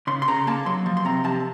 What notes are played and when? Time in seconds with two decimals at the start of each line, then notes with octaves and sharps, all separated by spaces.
0.07 C#3 C6
0.22 C6
0.28 C#3 A#5
0.47 A#3 A5
0.66 F#3 C6
0.86 F3
0.97 C6
1.05 C3 A#5
1.24 C3 A5